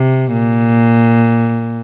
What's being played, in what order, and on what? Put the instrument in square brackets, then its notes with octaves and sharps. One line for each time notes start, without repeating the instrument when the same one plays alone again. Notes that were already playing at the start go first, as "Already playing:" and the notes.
Already playing: [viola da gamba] C3
A#2